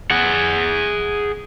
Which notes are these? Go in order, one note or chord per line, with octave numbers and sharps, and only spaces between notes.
G#4 F#5